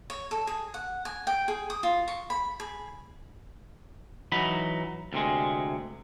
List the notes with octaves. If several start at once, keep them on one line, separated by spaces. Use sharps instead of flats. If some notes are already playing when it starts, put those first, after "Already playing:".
C#5
A4
G#4
F#5
G#5
G5
G#4
D#6
F4
C#6
B5
G#4
E3 F#3 D#4 B5
D2 C3 G#3